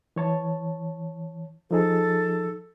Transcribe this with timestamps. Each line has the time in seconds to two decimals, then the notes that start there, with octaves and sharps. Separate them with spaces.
0.16 E3 C#5 A5
1.71 F3 D#4 G#4 A4